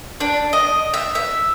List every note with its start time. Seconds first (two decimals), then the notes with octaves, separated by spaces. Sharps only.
0.20 D4
0.53 D#5
0.94 E5
1.15 E5